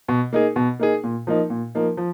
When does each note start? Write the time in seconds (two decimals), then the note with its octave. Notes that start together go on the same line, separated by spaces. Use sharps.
0.08 B2
0.33 A#3 D#4 G#4
0.56 B2
0.79 A#3 D#4 G#4
1.04 A#2
1.27 F3 A#3 D#4
1.50 A#2
1.75 F3 A#3 D#4
1.97 F3